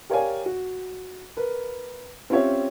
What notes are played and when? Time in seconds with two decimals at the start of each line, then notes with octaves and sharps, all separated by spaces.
0.10 G4 A#4 C#5 D5 F5 G#5
0.46 F#4
1.37 A#4 B4
2.30 C4 C#4 F4 G4 C#5 E5